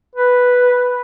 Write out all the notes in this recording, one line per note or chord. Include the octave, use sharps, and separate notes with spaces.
B4